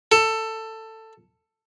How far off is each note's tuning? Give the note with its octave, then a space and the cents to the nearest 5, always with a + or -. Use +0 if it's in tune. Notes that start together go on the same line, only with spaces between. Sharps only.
A4 +15